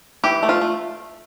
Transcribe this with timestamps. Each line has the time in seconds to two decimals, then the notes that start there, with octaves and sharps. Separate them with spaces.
0.24 E3 G4
0.43 A3
0.49 F4
0.61 A3